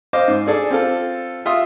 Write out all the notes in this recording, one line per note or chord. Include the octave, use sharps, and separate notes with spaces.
C5 D#5 F5 D6
G#2
D4 G#4 A4 D5
C4 F4 A4
F4 E5 C6 D#6